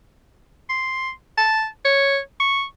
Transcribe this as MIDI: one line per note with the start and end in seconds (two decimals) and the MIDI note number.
0.69 1.10 84
1.37 1.66 81
1.85 2.19 73
2.40 2.63 85